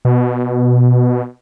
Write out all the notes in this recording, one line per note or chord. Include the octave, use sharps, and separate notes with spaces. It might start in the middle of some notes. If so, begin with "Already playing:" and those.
B2